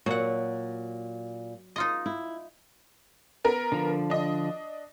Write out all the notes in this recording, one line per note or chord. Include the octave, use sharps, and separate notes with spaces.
A#2 F#3 F#5
D#4 F4 D#5
E4
B3 A#4
D3 F3
D4 D#5